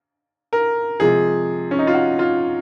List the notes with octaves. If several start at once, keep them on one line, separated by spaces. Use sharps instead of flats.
A#4
C3 F3 G#3 G#4
C#4
D#4
F4
F#4
F4